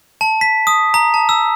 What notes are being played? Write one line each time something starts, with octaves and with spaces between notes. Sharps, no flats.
A5
B6
D#6
A#5
A5
E6